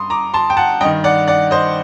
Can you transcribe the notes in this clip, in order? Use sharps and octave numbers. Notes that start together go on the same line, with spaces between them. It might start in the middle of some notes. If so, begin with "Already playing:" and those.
Already playing: G2 C6 D#6
A#5 D6
A5 C6
G5
F#5 A5
G2 D#3 D#5 G5
D5 F#5
D5 F#5
C5 D#5